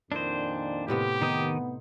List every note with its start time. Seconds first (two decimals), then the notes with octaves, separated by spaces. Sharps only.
0.12 F2 A#2 D#3 D4 E4 C5 D#5
0.88 A2 C3 B3 G4
1.22 D#3 B3 D#4 C5 D#6